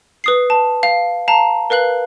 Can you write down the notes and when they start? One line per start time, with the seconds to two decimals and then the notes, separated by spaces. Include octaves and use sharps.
0.24 B4 D#6 C7
0.50 A5
0.83 F5
1.28 F5 A5 A#5
1.70 A#4 B4 F5 F#6 F#7